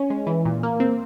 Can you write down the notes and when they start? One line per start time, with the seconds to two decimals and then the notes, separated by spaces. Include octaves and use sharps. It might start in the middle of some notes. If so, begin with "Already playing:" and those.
Already playing: C#4
0.10 G#3
0.27 E3
0.45 A#2
0.63 A#3
0.80 C4